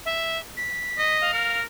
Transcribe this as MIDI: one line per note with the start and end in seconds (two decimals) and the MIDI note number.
0.05 0.38 76
0.57 1.18 95
0.98 1.30 75
1.21 1.60 77
1.33 1.63 70